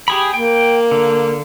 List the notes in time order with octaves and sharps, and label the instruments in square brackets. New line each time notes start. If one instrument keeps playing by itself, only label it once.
[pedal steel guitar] G4 G#4 B5
[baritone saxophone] A#3 [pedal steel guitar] G5
[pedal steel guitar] D3